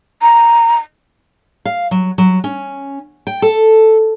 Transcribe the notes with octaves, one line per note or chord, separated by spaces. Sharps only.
A#5
F5
F#3
F#3
C#4
G5
A4